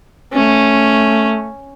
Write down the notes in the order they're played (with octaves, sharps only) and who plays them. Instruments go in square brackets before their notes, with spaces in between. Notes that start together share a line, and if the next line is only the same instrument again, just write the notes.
[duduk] A3 [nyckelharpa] C#4